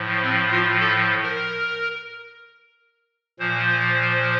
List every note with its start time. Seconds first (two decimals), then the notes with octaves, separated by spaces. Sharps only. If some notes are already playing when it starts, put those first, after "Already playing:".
Already playing: A2 F3
0.22 C4
0.50 F4
0.80 A4
1.23 A#4
3.39 A#2 F3 C5